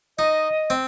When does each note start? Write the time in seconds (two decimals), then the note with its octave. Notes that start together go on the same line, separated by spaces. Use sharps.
0.18 D#4 D#5
0.70 C4